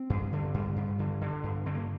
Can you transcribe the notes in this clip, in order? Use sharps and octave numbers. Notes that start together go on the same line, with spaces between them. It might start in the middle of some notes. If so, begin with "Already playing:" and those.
Already playing: C4
G2
D3
G2
G2
D3
D3
G2
D3 C4
A#3